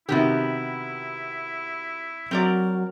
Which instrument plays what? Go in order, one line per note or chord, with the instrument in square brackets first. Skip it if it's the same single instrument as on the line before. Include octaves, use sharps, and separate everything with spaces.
[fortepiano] C3 D#3 [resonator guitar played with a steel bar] B3 F#4 G4 [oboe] E4
[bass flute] F#3 [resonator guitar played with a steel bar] C4 A#4 D5